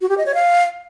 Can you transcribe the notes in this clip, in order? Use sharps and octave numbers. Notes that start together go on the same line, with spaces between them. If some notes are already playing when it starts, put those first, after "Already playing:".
F#4
G4
D#5
C#5
F5